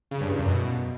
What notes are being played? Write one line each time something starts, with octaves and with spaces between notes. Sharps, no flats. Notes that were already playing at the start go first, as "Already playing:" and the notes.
C#3
G2
E2
F#2
B2